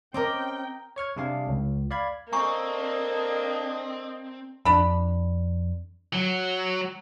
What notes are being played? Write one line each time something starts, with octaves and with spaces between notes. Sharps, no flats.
C4 C#4 A#4 D#5 G5 D6 F6
C#5 C#6 F6 G#6
C3 G3 D4 G#4 F5
C#2
D5 F5 B5 G#6
A#3 C4 D4 A4 D#5 G#5 A#5 C#6
F2 D4 B5
F#3